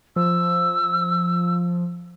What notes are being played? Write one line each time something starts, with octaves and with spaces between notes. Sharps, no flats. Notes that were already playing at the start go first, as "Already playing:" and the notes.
F3 E6